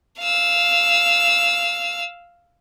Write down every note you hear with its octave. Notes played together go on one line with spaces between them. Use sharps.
F5 E6